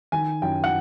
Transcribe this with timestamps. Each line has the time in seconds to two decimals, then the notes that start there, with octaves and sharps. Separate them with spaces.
0.12 D#3 G#5
0.42 F#2 G5
0.64 F#5